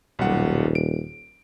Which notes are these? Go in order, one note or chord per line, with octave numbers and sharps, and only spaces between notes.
D#1 B1 G3 F#5
D7